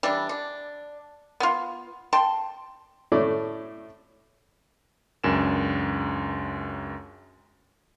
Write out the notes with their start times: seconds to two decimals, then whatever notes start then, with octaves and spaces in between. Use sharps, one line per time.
0.03 E3 G3 D4
0.29 D4
1.40 B3 F4
2.13 G5 A5 C6
3.12 A2 A3 C#4 C#5 D5
5.24 C#2 F#2 D4 A#4 G#5 E7